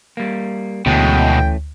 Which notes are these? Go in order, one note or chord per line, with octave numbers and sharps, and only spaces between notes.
G3 A#3
D2 B2 E3 G#3 A3 C#4 G5